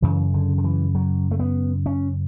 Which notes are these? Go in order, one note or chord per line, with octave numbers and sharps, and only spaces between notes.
F#2 C#3 E3
D3
D3
E3
F#3
A3
B3
C#4